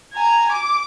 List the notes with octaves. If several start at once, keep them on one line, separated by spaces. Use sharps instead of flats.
G#5 A#5
D6